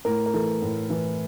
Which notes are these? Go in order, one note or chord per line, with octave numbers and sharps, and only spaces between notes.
A2 A#4
A#4
E3 A4
A2
E3